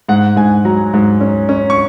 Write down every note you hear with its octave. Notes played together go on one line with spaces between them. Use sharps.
G#2 F#5
G#2 G#5
F#3 A#5
G#2
C#4
C#4
C#6